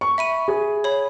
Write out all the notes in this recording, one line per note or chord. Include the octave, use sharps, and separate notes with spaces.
C#6
E5 B5 D#7
G#4
C#5 B5